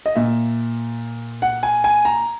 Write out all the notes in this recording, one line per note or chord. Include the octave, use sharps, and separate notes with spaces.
D#5
A#2 E5
F#5
G#5
G#5
A#5